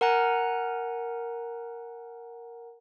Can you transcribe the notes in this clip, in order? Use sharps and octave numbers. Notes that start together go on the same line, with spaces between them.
A#4 F#5 G#5 A#5 F#6